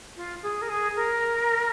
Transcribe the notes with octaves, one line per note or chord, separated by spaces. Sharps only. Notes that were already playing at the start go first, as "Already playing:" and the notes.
F4
G#4
A#4
G#4
A#4